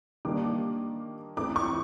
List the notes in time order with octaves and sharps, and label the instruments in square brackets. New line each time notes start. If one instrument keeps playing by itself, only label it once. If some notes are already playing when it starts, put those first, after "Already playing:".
[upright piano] D#3 G3 A#3 D4 [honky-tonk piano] D6
[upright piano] E3 A3 C4 [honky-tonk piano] D6
[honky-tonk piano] C#6